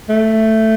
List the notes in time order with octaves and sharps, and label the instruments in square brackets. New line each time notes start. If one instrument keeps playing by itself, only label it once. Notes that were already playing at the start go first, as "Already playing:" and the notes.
[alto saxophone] A3